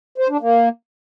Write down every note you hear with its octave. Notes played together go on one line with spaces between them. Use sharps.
C5
D4
A#3